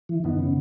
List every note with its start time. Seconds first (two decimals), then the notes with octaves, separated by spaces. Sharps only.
0.09 E3
0.24 F#2 D#3 E3 B3
0.39 C#3